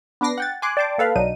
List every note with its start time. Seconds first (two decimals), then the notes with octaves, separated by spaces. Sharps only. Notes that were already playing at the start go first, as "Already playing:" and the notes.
0.21 B3 D4 B4 D6 A#6 C7
0.38 F#5 G5 A6
0.62 G#5 C6 D6 F#6
0.77 D5 G5 A5 C6 D6
0.98 A#3 A4 B4 F5
1.16 B1 F#3 D4 D#4 D#7